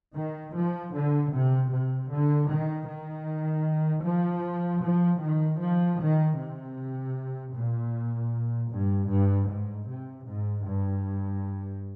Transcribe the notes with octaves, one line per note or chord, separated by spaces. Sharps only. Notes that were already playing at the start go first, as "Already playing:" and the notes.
D#3
F3
D3
C3
C3
D3
D#3
D#3
F3
F3
D#3
F3
D#3
C3
A#2
G2
G2
G#2
C3
G#2
G2